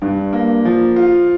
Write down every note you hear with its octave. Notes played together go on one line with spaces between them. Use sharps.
G2
A#3
F3
F4